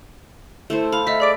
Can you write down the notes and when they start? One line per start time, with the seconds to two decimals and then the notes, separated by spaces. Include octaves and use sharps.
0.70 A3 E4 C5
0.92 F5 B5
1.07 A3 D#5 E5 B6
1.20 G#4 D5 B6 D7